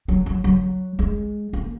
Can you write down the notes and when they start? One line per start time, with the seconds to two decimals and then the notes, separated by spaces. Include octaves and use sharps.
0.08 F#3
0.26 F#3
0.44 F#3
0.99 G#3
1.53 A#3